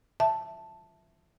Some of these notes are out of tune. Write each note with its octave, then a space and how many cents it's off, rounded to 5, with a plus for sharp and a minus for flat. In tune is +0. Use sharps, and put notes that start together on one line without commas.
E5 +0 A5 +0